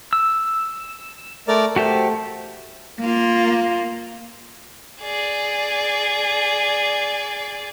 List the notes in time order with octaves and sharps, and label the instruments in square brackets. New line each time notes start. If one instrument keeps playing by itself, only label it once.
[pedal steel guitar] E6
[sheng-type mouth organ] A3 A#4 D5
[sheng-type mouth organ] A3 [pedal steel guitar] F#4 G4 C5
[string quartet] A#3 F4
[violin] G#4 D5